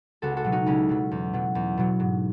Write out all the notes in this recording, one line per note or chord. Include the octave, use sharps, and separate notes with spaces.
C#2 F#4 A4
F#4 A4
B2 F#3
D#4 F#4
C#2 C#4 E4
B2 F#3
E2
B2 F#3
E2
B2 F#3
G#2